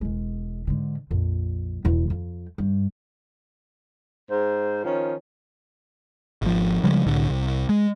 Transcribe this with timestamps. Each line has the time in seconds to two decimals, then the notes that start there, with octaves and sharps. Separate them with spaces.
0.01 E1 G#3
0.67 G#2 D3
1.11 A#1 F2
1.84 E1 E2
2.10 F2
2.58 G2
4.30 G#2 C5
4.84 D#3 F3 C#4
6.42 G#1 F3
6.84 C#3 F3 G3 G#3
7.06 C2 A2 D3
7.29 C2
7.69 G#3